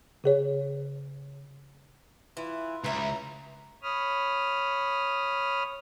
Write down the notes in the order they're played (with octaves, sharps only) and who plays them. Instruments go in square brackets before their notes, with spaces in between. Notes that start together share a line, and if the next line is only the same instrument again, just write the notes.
[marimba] C#3 G#4 C#5
[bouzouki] E3 [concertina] E4 F4
[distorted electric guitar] C#2 [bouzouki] B4 E5 [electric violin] A#5
[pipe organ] C#5 B5 D#6 F6